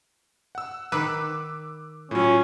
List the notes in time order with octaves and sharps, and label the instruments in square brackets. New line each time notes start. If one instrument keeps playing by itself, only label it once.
[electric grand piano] F#5 E6
[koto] D#3 B4 [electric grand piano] D6 E6 F#6
[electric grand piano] A2 F#3 [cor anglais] C#4 [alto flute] F4